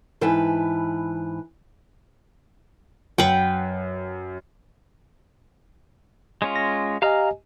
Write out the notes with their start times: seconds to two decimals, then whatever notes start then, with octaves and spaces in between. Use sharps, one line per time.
0.21 G#2 E3 B4 G5 A5
3.18 F#2 B4 F#5 G5
6.42 G#3 C#4 F4
6.56 A#6
7.02 G4 D#5 F5 G#5 A#5 F6